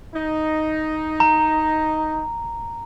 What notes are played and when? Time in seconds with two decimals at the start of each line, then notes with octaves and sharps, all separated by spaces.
0.14 D#4
1.20 A#5